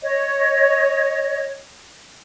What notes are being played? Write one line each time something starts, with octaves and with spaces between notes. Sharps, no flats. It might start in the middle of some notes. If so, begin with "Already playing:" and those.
C#5 D#5